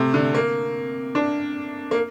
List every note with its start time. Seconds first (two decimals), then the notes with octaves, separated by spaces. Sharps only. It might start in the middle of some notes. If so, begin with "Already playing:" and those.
Already playing: C3 A3 C4
0.14 D3
0.34 A#3
1.15 D4
1.91 A#3